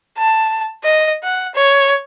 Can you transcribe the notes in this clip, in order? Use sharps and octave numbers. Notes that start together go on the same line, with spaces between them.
A5
D#5
F#5
C#5